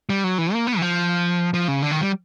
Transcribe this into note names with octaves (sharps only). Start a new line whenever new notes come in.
G3
F#3
E3
A#3
B3
E3
F3
F3
C#3
D3
D#3
G3